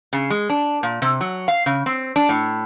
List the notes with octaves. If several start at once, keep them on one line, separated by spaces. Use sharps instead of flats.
C#3
G#3
D4
A#2
C3
F#3
F5
C#3
C4
D4
A2